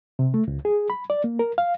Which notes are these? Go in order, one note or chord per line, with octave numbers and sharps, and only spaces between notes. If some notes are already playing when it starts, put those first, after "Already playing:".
C3
A3
C#2
G#4
B5
D5
A#3
A#4
F5